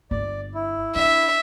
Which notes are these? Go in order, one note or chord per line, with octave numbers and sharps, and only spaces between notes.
G1 D5
E4
D4 E5